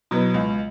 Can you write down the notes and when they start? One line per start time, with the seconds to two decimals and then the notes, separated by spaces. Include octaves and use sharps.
0.11 B2 F#3 B3
0.34 C#2